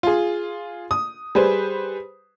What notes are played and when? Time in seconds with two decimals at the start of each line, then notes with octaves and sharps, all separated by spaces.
0.03 F4 G#4
0.91 D#6
1.35 G3 G#4 B4 C5